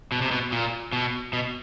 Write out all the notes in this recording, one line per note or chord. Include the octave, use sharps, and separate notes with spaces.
B2
C3
B2
A#2
B2
B2